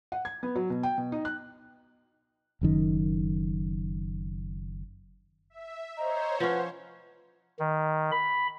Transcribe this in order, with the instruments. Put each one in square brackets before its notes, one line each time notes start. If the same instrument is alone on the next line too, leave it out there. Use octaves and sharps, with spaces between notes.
[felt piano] F#5
G#6
B3
F#3
B2
G5
B2
D#4
F#6
[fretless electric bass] F#1 F#2 D#3
[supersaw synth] E5
[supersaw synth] C5 C#5 [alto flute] D#5 [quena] A#5
[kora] F3 C#4 [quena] B4 [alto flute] F#5
[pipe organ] D#3
B5